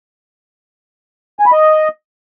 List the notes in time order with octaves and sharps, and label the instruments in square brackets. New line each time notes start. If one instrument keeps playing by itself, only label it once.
[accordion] G#5
B5
D#5